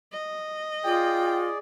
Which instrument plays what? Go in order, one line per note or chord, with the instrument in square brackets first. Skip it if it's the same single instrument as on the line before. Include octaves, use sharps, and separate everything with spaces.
[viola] D#5
[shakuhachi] F4 [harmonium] G#4 D5 [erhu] G5